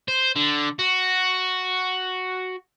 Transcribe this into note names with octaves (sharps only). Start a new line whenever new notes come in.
C5
D3
F#4